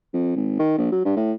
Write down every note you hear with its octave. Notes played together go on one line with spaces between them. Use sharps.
F2
G#1
D#3
A#1
F#3
G2
A2